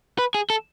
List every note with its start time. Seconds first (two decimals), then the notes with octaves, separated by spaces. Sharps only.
0.19 B4
0.35 G#4
0.50 A4